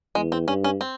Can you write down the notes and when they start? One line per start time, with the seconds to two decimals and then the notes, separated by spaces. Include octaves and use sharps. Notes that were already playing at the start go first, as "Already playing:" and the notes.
0.15 E2 G#3
0.32 C4
0.48 G2 C#4
0.64 C#4
0.81 C4